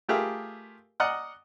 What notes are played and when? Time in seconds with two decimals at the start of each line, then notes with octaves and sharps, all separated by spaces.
0.08 A3 F4 G4 G#4 A#4 E5
1.00 D5 D#5 F#5 A#5 D#6 F6